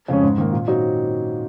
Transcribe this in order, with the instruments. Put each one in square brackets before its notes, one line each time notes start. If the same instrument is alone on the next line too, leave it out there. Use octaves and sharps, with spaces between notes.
[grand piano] F2 C#3 G#3 C#4
G#2
D#3 A#3
A#2
F#3 C4 D#4 F#4